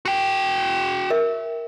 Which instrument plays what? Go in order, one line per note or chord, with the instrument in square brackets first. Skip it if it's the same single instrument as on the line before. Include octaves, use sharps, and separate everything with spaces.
[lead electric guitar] F#4 G5
[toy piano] A#4 E5